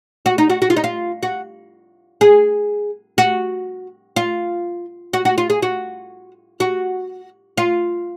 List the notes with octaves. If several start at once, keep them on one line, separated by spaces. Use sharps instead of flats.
F#4
D#4
F#4
F#4
F4
D#4
F4
F#4
G#4
F#4
F4
F#4
F#4
F4
G#4
F#4
F#4
F4